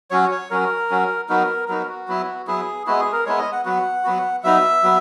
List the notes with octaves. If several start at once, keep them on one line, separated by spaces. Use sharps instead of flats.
F#3 C#4 F#4 C#5
C#5
F#3 C#4 F#4 A#4
F#3 C#4 F#4
F#3 B3 D#4 F#4 A#4
F#3 B3 D#4 F#4 A#4
F#4
F#3 B3 E4
F#3 B3 E4 G#4
G#3 B3 E4 F#4
G#4
A#4
G#3 B3 E4 C#5
D#5
F#5
F#3 B3 F#4 F#5
F#3 B3 F#4
F#3 B3 D#4 E5
F#3 B3